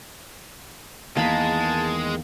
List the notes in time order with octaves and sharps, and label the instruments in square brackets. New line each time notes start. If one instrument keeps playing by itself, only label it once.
[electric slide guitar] E2 D#3 [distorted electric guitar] G#3 [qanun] A#3 B5 [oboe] A5